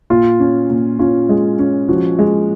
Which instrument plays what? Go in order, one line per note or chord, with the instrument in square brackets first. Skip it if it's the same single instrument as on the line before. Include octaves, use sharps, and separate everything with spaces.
[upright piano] A#2 [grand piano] F4
[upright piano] C#4
A#2
[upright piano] C#4 [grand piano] F4
[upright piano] G#3
C#4
[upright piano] F3 [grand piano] F#4
[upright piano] G#3